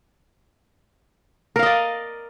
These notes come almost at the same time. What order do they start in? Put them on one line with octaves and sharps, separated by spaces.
A#4 F5 D#5 D5